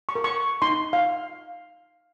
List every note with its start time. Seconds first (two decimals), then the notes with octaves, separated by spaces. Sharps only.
0.09 C#6
0.15 A#4
0.24 C#6
0.62 D#4 C6
0.93 F5